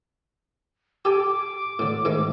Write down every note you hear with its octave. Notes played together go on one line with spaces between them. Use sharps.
G4 A4 G#5 D6
A2 D3
G#2 D#3 A3